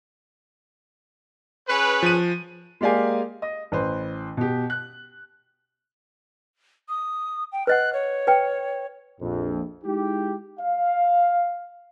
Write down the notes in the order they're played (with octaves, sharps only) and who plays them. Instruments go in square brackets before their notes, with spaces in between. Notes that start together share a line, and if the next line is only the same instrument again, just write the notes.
[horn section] C#4 G#4 B4
[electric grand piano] F3 D#7
[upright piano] G#3 A#3 G4 D5 F5 G#5
D#5
A1 B4 C5
B2 G4
F#6
[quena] D#6
G5
[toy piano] B4 D#5 F#5 [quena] F#6
[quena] C#5
[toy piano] B4 G5
[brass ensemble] A#1 F2
G#3 D#4 E4 G4
F5